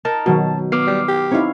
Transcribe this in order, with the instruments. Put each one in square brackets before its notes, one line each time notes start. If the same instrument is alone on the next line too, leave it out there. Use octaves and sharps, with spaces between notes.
[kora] D#4 A#4 [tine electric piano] A5
[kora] B2 [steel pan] D#3 F#3 F#4
[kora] B3 [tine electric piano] D6 F6 C7
[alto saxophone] G3
G4
[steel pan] C4 D#4 E4 [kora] C#5 F5